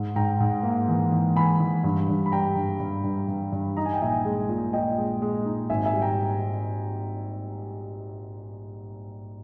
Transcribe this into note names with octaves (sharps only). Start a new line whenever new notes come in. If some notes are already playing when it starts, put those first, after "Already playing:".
Already playing: G#2
G#2 G5 A#5
G#2
A#3
E3
E3
E3 G#5 B5
E3
G2
G2
B5
G3 G5 A#5
G2
G2
G2
G2
G2
D#4 A#5
G#5
G5
A#1 E5 G#5
G#3
A#2
A#2 D#5 G5
G#3
G#3
D#4
G#1 E5 G#5
E5 G#5
G3
G5 A#5